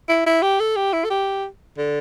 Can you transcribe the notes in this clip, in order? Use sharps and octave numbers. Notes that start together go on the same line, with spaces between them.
E4
E4
G4
A4
G4
E4
A4
G4
D3